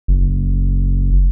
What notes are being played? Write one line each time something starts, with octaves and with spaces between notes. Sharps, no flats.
F#1